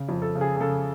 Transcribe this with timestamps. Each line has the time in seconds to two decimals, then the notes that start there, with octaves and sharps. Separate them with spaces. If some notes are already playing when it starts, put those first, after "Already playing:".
Already playing: C#3
0.09 F2
0.22 A4
0.35 C#3
0.41 G#4
0.56 G#4
0.60 C#3 A4